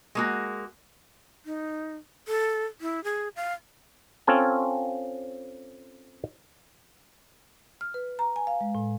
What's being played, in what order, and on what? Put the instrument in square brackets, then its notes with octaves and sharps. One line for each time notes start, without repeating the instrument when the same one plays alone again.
[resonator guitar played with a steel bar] G#3 A#3 F#4
[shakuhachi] D#4
A4
E4
G#4
F5
[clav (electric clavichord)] C4 C#4 F4 A4 G#5
[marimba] F6
B4
A#5
G#5
F5
G#3
A2